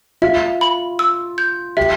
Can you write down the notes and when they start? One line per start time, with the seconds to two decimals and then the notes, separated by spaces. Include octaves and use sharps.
0.22 F4 E5
0.61 B5
0.99 E6
1.38 G6
1.77 G4 E5